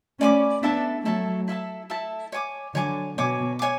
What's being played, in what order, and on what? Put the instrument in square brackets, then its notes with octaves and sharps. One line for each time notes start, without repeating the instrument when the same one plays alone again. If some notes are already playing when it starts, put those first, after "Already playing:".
[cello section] A3 C#4 [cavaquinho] D5 G#5 B5 D6
[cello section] B3 D4 [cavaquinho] E4 A4 E5 A5
[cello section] F#3 A3 [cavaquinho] E4 A4 E5 A5
[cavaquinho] E4 A4 E5 A5
E4 A4 E5 A5
C#5 G#5 D6
[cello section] D3 F#3 [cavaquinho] C#5 G#5 D6
[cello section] B2 [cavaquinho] C#5 G#5 D6
[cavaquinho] C#5 G#5 D6